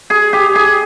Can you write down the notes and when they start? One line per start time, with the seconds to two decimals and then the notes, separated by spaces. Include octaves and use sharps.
0.10 G#4
0.33 G4
0.55 G#4